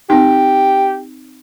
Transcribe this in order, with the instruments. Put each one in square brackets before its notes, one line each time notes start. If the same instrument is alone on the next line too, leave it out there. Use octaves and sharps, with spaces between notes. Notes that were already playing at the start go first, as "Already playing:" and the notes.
[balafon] C4 D#4 [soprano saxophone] G4